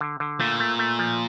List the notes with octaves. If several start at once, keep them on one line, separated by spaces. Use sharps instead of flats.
D3
D3
A#2 A3
A3
A3
F3